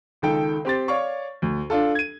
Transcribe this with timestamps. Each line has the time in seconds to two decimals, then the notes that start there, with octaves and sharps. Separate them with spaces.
0.22 C#2 D#3 A4 G5
0.65 C4 G4 C6 A6
0.88 C#5 D5 F5 C#6
1.42 D2
1.70 D4 F4 A4
1.95 G#6 D#7